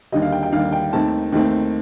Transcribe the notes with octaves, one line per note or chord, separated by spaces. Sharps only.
D#2 D3 G3 D#5
F5
G5
G5
D#2 D3 G3 F5
G5
D#2 D#3 A3 C4 A5
D#2 D#3 A3 C4